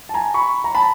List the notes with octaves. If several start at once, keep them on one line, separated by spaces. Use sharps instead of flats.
A5
G#5 A#5
B5 C#6
A#5
A5 B5